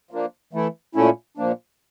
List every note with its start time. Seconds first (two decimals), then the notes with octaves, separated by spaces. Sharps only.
0.11 F3 A#3 D4
0.53 E3 A3 E4
0.95 A#2 A3 C#4 E4
1.37 A#2 F3 A#3 D4